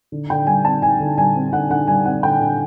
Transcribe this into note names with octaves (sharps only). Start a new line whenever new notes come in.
D3
D3 G5
G3 G#5
C4 A5
D3 G#5
D3
G3 G#5
C4
D3 F#5
D3 F#5
G3 G#5
C4 F#5
D3 G5
D3